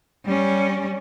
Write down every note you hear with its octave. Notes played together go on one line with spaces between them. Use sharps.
G3 C#4